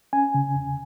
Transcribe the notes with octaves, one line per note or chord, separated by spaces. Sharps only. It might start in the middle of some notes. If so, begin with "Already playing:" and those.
C#4 G#5
C#3
E2